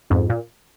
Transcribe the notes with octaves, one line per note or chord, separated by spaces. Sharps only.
F2 G#2
A#2